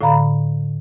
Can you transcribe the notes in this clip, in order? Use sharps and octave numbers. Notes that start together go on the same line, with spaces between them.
A2 D3 F5 A#5 B5